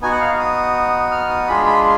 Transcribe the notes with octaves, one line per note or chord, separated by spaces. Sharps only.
B3 D#4 F#4 G#5
F#5
F5
D#6
F6
D#6
G#3 D4 F4 G#4 B5
B5